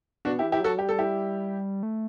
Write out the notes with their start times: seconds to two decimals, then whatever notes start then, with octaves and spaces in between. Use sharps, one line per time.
0.25 B2 D4 F#4
0.39 E4 G4
0.43 E3
0.52 E4 G4
0.60 F#3 F#4 A4
0.78 G3 G4
0.89 A4
0.99 E4 G4
1.83 A3